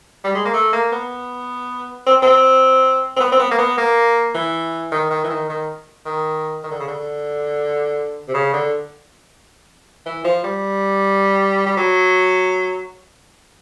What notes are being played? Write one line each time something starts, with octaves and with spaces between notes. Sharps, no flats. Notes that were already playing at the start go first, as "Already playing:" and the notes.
G3
G#3
A#3
A3
A#3
B3
C4
C4
C4
B3
C4
B3
A#3
B3
A#3
E3
D#3
D#3
E3
D#3
D#3
D#3
D#3
D3
C#3
D3
C3
C#3
D3
E3
F3
G3
G3
F#3